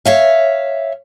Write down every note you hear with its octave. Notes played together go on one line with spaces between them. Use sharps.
C#5 E5 F5